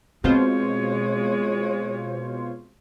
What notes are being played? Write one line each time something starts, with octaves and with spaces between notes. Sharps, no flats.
B2 G#3 C4 F4 C5 C#5